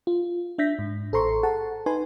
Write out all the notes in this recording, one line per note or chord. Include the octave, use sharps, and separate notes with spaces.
F4
D4 E5 G6 A#6 B6
G#2
A1 A4 C5 A#5 C6 C#6
G#4 A4 F#5 A5
D#4 B4 G#5 C6